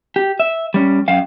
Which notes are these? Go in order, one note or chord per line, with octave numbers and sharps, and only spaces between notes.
G4
E5
G3 C#4
F#2 F5 G5